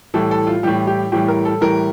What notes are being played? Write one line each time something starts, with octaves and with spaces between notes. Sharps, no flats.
A2 E3 G3 A4
A4
F4
A2 E3 G3 G4
G4
A2 E3 G3 G4
A#4
A4
A2 E3 G3 A#4